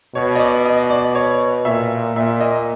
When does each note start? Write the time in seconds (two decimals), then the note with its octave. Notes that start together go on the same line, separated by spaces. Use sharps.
0.15 B2 C#5
0.36 D#5
0.39 D5
0.65 D#5
0.90 D5
1.15 C#5
1.65 A#2 E5
2.16 A#2 E5
2.41 D#5